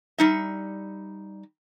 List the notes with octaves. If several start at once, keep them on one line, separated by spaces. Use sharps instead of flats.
G3 D#4 E5